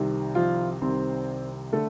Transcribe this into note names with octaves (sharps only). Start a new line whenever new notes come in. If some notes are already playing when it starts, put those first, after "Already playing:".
Already playing: C2 C3 D#3
F3 F4
C2 C3 D#3 C4 C5
D3 A3 A4